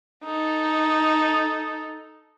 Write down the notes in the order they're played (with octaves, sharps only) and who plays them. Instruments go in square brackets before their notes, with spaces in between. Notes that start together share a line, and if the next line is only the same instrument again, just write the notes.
[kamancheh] D#4 A4